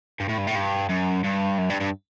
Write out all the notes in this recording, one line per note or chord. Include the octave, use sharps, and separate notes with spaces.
G2
A2
G2
A2
G2
F#2
G2
F#2
G2
G2